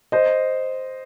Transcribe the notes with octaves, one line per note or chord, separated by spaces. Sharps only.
C5 D#5